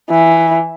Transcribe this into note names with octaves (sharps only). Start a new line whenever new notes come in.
E3